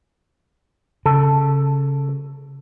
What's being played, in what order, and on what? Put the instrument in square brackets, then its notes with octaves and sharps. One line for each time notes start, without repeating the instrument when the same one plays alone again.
[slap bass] C#3 [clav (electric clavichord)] A4